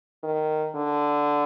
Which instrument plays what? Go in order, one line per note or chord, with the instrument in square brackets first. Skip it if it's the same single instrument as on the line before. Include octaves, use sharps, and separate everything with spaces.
[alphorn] D#3
D3